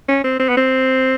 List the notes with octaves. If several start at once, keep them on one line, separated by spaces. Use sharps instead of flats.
C#4
C4
C4
B3
C4